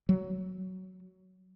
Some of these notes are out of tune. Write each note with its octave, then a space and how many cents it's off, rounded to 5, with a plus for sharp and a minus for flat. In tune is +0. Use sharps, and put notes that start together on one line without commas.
F#3 +10